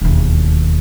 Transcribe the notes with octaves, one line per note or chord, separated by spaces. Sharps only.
E1 D#2